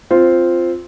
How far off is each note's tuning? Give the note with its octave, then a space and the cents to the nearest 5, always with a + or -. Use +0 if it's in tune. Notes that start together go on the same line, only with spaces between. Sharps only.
C4 +0 F4 -5